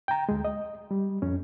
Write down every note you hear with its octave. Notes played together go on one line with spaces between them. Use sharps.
G5 A#5
D2 G#3
D#5
G3
F2 C#4